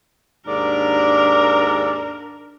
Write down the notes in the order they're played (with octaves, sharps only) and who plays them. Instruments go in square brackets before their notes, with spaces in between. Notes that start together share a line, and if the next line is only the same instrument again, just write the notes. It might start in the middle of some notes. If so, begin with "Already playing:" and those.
[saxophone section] D#2 G#2 D5 [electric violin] D4 A#4